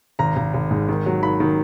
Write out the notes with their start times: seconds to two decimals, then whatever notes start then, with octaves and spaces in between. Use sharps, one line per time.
0.19 G#1 A#5
0.36 G#1
0.54 G#1
0.71 G#2
0.89 D#3
1.06 F#3
1.22 D#3 B5
1.40 D#3